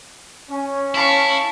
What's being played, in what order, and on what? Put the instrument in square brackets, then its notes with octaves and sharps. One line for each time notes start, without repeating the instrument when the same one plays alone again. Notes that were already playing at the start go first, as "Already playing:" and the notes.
[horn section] C#4
[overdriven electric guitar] E4 [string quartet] F5 A5 C#6